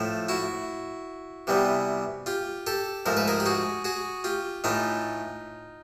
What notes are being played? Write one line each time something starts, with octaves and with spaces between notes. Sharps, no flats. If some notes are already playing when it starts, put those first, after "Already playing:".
Already playing: A2 F3 A3
E4 F#4
C3 E3 G3 B3
F4 G4
G4 A4
G#2 F3 A3 A#4
B4
G#4 A#4
G4
F#4 G#4
F#4 G#4
F4 G4
A2 E3 A3 D#4 F4